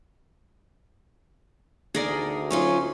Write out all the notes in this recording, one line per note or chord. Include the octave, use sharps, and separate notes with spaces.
D2 D#4 G#4 A#4 D5
F#3 C#4 D#4 F4